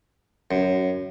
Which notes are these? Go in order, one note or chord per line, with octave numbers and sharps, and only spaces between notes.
F#2